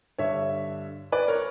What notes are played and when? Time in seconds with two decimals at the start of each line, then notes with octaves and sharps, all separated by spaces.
0.18 G2 D3 C#5 E5
1.12 B4 D5
1.28 A#4 C#5